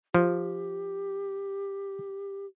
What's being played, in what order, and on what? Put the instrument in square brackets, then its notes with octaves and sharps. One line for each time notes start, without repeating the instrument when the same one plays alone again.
[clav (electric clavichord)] F3 [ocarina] G4